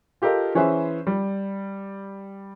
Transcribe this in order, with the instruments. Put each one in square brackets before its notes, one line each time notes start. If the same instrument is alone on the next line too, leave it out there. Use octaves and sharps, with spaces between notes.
[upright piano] F4 G4 A4 A#4 D#5
E3 C#4 G#4 B4 C5 E5
G3